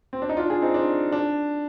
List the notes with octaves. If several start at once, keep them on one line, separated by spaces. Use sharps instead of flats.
C4
D4
D#4
D4 F4
F4 G#4
C4 D#4
D4
D4